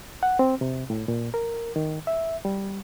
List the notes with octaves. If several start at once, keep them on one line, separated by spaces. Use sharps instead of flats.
F#5
C4
C3
A2
A#2
A#4
D#3
E5
G3